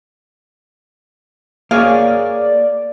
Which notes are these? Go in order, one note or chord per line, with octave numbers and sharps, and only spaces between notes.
A#3 G#4 C#5 D5 F5